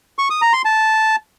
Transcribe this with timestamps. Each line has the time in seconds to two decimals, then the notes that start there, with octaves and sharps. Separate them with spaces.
0.18 C#6
0.30 D#6
0.42 A#5
0.53 C6
0.65 A5